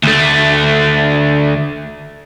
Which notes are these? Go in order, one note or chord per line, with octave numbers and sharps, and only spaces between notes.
D2 A3